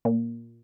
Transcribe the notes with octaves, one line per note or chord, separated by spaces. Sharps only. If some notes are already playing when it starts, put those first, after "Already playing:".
A#2